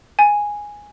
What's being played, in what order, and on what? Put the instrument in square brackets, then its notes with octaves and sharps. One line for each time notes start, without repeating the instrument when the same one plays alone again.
[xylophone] G#5